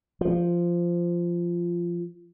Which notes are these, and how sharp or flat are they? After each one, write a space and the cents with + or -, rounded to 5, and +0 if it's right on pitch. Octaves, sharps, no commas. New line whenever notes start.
F3 -10